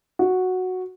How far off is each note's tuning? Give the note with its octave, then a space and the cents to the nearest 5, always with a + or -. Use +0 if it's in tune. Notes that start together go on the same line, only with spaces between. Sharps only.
F#4 -5